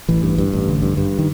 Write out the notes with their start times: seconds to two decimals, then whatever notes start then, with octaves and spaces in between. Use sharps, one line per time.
0.09 A1 E3
0.23 G2
0.38 G2
0.53 A1
0.68 D3
0.82 G2
0.97 G2
1.18 D#3